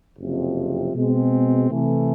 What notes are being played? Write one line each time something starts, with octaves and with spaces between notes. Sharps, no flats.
F#1 F2 C3 F3
B2 G#3 C4
C3 E3 A3